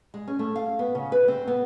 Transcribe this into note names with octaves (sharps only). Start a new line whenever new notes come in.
G#3
C#4
A3
F5
B3
C#3
B4
C4
B3